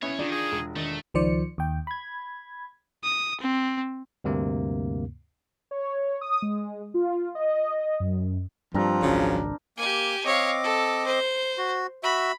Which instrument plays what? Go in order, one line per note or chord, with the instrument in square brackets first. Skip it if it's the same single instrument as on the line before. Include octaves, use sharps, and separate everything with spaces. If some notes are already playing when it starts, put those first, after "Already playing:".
[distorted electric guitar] B1 C#5 [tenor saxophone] B3 [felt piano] C#4 E4
[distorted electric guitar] D#3 [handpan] D4 F4 [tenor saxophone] G#4 [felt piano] D5
[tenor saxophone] G#4
[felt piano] E1
[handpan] D#3 D4 [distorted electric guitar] A3 [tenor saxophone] D#5
[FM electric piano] C#2 D#3 F3 C5 D5 C#7
D#2 G5
B5 G#6
[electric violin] D#6
C4
[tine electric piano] D2 G2 C3 A#3
[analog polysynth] C#5
D#6
G#3
F4
D#5
F#2
[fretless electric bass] G2 G3 [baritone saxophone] F3 [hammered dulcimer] C4 D4 A#4
[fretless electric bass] G#1 C#2 [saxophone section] F#2 C#3
[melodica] A#3 [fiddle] G4 G#5
[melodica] C4 D#5 D6 [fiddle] C#5 F5
[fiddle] A4
C5
[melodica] F#4
[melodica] F#4 E5 [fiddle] B5